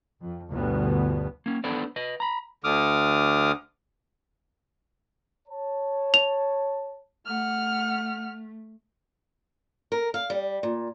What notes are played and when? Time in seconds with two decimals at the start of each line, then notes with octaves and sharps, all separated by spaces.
0.21 F2
0.51 G1 D2 G2 B2 G3 B3
1.46 A#3 C#4
1.64 B3 D4 A4 B4 C5 D5
1.96 B4 D#5
2.20 A#5 B5
2.64 D2 D3 D6 D#6 F6
5.48 C#5 A5
6.14 F7
7.26 A3 F#5 F6
9.92 A#4
10.14 F5
10.30 G3
10.63 A#2